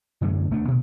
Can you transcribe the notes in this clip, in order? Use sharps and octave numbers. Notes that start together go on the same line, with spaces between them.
F#2 D3 F#3 A3
D#1 A3 D4
A#2